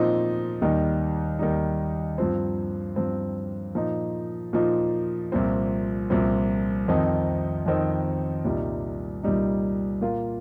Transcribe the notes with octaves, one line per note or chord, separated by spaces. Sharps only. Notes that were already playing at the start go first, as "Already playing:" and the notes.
Already playing: A#2 F3 C4 D#4
D#2 D#3 G3 D#4
D#2 D#3 G3 D#4
G2 F3 C4
G2 F3 C4
A#2 F3 D#4
A#2 F3 D#4
C2 A#2 F3 C4
C2 A#2 F3 C4
F2 D#3 C4 D#4
F2 D#3 C4 D#4
C2 A#2 G3 D#4
C2 A#2 G3 D#4
A#2 A#3 F4